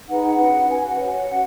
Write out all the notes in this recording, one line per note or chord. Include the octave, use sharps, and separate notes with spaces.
D#4 G#4 B4 F#5
F#5
C#4 F#4 B4
F#4 B4 G#5
F#5
F#4 C#5
C#4 F#4